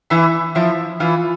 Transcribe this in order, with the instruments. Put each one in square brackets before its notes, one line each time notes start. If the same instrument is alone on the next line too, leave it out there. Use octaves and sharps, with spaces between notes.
[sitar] E3 [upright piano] E4 E5
[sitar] F3 [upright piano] E4 E5
[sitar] E3 [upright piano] F4 F5